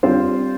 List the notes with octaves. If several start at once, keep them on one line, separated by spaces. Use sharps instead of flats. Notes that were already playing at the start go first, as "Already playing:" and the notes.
D3 G3 C4 F4 C5